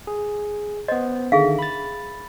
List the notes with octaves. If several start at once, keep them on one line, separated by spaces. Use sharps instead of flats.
G#4
B3 C5 D#5
D3 D#3 G#4 E5 F5
B5 A6